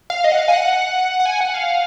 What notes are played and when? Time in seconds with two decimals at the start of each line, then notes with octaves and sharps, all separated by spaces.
0.10 F5
0.24 D#5
0.32 F#5
0.39 F5
0.48 G#5
0.53 F#5
1.20 F#5
1.26 G#5
1.41 F#5
1.54 F5